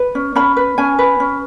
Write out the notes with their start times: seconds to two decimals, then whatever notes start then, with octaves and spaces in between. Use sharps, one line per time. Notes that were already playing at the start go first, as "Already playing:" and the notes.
Already playing: B4
0.15 C#4
0.35 C#4 B5
0.57 B4
0.78 C#4 G#5
0.99 B4
1.20 C#4